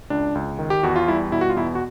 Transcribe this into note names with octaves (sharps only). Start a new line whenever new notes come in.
C#2 D4
C#2
D#3
G4
E2 F#4
F4
G3 E4
B2 E4
F#4
F4
E2 E4
F#4